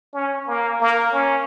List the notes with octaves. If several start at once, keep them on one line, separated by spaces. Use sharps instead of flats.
C#4
A#3
A#3
C#4